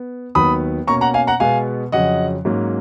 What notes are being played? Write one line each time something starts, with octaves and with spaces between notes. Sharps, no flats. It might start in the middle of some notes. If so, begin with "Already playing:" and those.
Already playing: B3
D#2 D#3 F#3 B3 B5 D#6
B2 A#3 C#4 A#5 C#6
F#5 A#5
F5 G#5
F#5 A#5
B2 G#3 B3 F5 G#5
F2 C#3 F#3 C#4 D#5 F#5
G#2 F#3 A#3 C#4